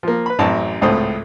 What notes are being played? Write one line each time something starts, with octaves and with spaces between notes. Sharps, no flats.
F3 A#3
B4 B5
A1 F#2 C4 E4 A5
G#1 C#2 A2 A3 C5 D#6